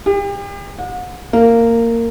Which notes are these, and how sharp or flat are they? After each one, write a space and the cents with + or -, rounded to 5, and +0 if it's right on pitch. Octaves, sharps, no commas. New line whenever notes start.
G4 +40
F#5 -40
A#3 -15